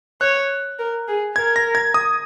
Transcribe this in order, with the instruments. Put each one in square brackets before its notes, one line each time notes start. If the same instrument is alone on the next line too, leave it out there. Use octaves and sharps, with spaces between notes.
[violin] C#5 [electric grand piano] F#6
[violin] A#4
G#4
[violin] A#4 [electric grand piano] G#6
[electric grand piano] A#6
G#6
D#6